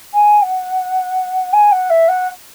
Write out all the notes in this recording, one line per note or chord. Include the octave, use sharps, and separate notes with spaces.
G#5
F#5
G#5
F#5
E5
F#5